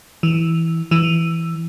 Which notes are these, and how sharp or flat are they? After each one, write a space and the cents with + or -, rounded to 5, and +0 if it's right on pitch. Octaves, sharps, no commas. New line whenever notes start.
E3 -10
E3 +5